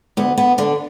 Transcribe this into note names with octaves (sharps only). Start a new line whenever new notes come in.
D2 B3
B3
D3 D4